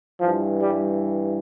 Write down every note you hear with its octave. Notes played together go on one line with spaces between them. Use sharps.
G2 E3 F3
G3